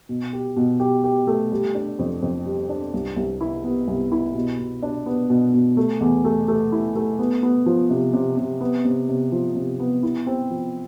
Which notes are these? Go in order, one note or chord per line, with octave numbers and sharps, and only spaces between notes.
B2
G4
B2
G4
G4
A3
G3
D4
F2
F2
G3
D4
C2
C2
E4
B3
C2
E4
B2
B2
D4
B3
B2
B2
A3
E2
A3
A3
E4
A3
B3
B3
F3
C3
C3
C3
B3
C3
C3
F3
C3
B3
E4
C4
F3